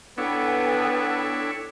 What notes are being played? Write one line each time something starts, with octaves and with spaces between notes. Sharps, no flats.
B3 D4 E4 A4 C#5 G5